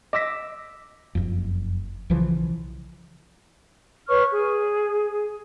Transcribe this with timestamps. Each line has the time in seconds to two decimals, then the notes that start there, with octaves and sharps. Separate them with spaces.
0.13 D#5 D6 E6 A#6 B6
1.15 F#1 F2
2.10 B1 C#3 E3 F3
4.08 B4 C#5 C#6 F6
4.30 G#4